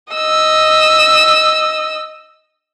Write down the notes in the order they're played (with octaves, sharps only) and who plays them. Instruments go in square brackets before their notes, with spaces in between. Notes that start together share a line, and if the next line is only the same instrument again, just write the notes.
[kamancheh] D#5 E6